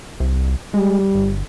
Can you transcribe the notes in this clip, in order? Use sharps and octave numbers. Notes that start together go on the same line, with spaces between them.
C2
G3 G#3
G1